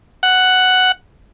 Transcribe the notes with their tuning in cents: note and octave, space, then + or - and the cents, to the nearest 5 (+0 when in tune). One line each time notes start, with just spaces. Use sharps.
F#5 +5